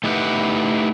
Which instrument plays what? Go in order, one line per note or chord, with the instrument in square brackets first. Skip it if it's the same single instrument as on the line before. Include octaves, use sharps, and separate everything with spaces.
[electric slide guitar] A3 D#4 E4 G4 B4 F#5